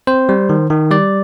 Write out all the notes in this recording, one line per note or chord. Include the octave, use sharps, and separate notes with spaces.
C4 C5
G3
D#3
D#3
G3 D5